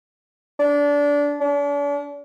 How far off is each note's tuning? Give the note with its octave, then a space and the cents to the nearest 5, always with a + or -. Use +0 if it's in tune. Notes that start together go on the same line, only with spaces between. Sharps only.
D4 -20
D4 -40